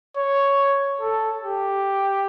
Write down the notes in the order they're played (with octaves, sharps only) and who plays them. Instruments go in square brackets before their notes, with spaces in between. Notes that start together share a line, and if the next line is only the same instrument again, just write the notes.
[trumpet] C#5
A4
G4